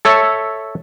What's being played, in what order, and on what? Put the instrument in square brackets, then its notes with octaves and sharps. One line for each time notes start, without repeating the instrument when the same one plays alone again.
[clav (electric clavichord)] A4 C#5 E5